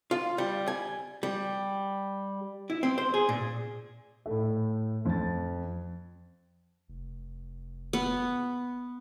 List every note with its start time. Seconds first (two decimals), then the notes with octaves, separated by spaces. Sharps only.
0.11 F4
0.38 G3
0.68 G#5
1.23 G3
2.70 E4
2.83 C4
2.98 C5
3.14 G#4
3.29 A#2
4.26 A2 A3
5.05 F2 A6
6.88 F1
7.93 B3